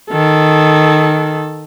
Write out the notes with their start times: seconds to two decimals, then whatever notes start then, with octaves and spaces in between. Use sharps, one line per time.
0.11 D#3 A4